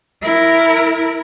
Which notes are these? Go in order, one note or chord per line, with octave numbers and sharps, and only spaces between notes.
E4 A#4